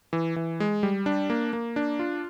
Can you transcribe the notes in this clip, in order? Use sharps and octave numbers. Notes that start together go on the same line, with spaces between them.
E3
E3
G#3
G3
D4
A#3
A#3
D4
F4